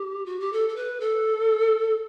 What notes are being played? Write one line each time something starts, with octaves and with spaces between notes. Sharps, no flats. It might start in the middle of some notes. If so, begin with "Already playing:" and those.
Already playing: G4
F#4
G4
A4
A4
B4
A4